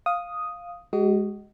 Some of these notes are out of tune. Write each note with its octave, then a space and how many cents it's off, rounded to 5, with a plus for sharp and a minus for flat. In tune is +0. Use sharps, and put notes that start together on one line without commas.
F5 +5 D#6 +0
G#3 +0 F#4 +40 D#5 +0